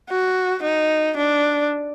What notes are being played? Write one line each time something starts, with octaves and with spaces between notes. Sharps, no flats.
F#4
D#4
D4